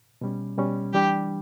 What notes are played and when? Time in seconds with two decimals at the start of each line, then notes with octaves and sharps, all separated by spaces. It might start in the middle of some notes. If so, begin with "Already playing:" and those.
0.21 B2 G3 C#4
0.58 B2 G3 C#4
0.93 E3 G3 D4 G4